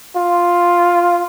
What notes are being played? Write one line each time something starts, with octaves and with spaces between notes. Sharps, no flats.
F4